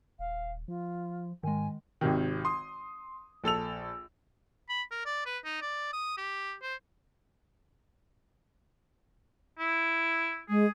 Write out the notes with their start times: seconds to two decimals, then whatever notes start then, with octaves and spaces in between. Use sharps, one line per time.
0.19 D#1 F5
0.68 F3 F4
1.43 G#2 D#3 G#3 G#5
2.01 G#1 C3 D#3
2.45 C6 D#6
3.44 A#1 A4 E6 F7
4.69 B5
4.91 A#4
5.05 D5
5.26 B4
5.45 D#4
5.62 D5
5.93 D#6
6.17 G4
6.62 C5
9.59 E4
10.49 G#3 G#4